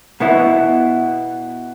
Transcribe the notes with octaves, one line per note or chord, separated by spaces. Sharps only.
B2 B3 E4